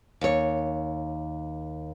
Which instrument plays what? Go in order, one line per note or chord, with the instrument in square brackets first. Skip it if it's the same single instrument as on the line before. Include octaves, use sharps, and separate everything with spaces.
[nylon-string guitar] D#2 C#5